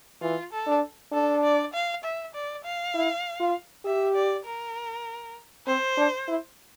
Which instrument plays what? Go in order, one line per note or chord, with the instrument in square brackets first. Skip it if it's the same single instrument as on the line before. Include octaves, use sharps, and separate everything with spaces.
[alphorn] E3 [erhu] F4
[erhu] A4
[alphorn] D4
[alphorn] D4 [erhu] A4
[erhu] D5
F5
E5
D5
F5
[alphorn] E4
F4
[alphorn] G4 [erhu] E5
[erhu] D5
A#4
[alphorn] C4 [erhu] C5
[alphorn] D4
E4